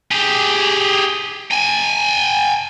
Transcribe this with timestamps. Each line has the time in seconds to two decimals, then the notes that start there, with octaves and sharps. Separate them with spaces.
0.11 G4 G#4
1.51 G5 G#5